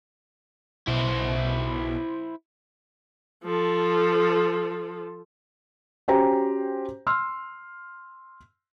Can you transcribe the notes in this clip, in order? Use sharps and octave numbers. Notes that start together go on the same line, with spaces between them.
B1 B2 E4 C5
F3 A4
C#4 F#4 G4 C5 G5 A#5
C6 E6 F6